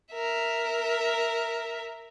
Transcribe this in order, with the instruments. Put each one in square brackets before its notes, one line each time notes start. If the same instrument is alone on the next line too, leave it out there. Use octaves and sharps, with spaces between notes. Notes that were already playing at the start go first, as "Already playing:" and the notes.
[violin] A#4 E5